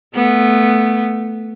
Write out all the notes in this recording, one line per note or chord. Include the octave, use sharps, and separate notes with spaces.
A3 B3